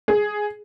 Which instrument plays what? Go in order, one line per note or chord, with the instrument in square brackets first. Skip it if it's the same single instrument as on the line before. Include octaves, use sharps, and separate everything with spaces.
[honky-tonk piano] G#4